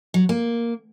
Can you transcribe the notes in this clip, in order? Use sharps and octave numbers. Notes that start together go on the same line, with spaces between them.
F#3
A#3